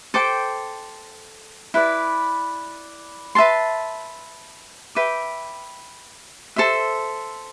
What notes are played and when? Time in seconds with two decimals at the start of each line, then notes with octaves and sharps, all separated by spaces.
0.14 A4 C5 G5 D6
1.74 E4 B4 D5
3.35 B4 E5 A5 C6
4.95 B4 E5 G5 D6
6.56 A4 C5 E5